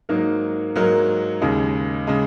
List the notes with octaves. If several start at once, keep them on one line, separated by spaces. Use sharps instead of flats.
G#2 F#3 A#3 D#4 A#4
G#2 F#3 A#3 D#4 A#4
D#2 C#3 G#3
C#3 G#3